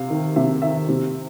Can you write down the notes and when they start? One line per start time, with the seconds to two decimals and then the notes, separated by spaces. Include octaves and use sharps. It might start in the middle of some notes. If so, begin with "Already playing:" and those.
Already playing: C3 F5
0.10 D#3
0.36 C3 E5
0.62 D#3 E5
0.89 C3